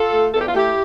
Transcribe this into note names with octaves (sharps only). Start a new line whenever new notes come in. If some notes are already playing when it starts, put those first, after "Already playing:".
Already playing: F4 A4
A3
E2 A4
G4
F4
A3 E4 G4